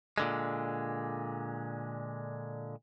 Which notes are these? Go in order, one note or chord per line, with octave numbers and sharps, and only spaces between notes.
A#2 D3 G#3